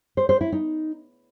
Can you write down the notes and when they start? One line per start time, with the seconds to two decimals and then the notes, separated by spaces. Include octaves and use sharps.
0.17 C5
0.29 C5
0.41 E4
0.52 D#4